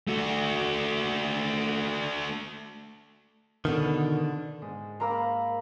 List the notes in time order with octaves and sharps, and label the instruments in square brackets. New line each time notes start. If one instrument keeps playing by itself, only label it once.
[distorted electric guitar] A3 F#4
[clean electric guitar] B2 D#3 [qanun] D3 B3 A4
[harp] G#2
[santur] A#3 A#4 C5 [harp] A#5 B5 E6